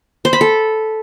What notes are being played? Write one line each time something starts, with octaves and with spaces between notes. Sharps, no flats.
C5
B5
A4